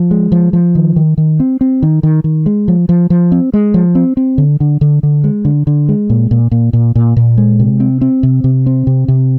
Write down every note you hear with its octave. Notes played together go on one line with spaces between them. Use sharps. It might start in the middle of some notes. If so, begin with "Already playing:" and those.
Already playing: F3
G#3
F3
F3
D#3
D#3
D#3
C4
C4
D#3
D#3
D#3
G#3
F3
F3
F3
C4
G#3
F3
C4
C4
D3
D3
D3
D3
G#3
D3
D3
G#3
A#2
A#2
A#2
A#2
A#2
A#2
G#3
C3
C4
C4
C3
C3
C4
C3
C3